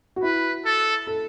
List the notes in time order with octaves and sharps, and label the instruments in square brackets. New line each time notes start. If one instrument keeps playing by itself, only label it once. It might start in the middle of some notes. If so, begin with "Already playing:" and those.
[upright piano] F#4
[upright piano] E4 [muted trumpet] B4
[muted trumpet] A4
[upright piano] A4